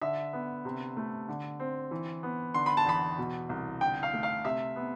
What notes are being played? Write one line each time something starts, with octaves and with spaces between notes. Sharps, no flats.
D3 E5
B3
C3
A3
D3
C4
E3
B3
D3 C6
B5
A5
E2 B5
B2
C2
D3 G5
F5
A3
F5
C3 E5
B3